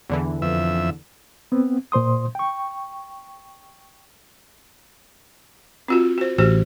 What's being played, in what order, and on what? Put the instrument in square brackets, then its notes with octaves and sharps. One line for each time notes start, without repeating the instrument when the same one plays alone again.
[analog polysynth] E2 D3 E3
[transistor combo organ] F2 E5
[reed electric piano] B3 C4
A#2 C5 C6 D#6
G5 C#6
[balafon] C4 F4 F#4
F#4 C5
[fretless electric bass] A1 [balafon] F#4 G4 C5